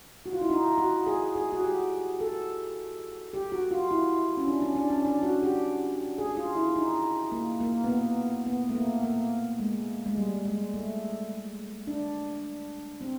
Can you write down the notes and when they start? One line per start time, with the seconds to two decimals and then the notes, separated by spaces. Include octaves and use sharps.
0.26 F#4
0.33 F4
0.41 E4
0.50 D#4
0.78 F#4
1.06 G#4
1.35 G#4
1.52 F#4
1.63 G4
2.20 A4
3.33 G4
3.52 F#4
3.71 F4
3.91 E4
4.37 C#4
4.48 D4
4.62 C#4
4.75 D4
4.90 C#4
5.05 D4
5.23 F#4
5.43 G4
6.18 G#4
6.37 F4
6.55 E4
6.76 D#4
7.32 A#3
7.60 A#3
7.84 B3
7.88 A#3
8.46 B3
8.69 A3
8.75 A#3
9.03 A#3
9.60 G#3
10.06 G#3
10.17 G3
10.45 G#3
10.74 A3
11.87 D4
13.01 C4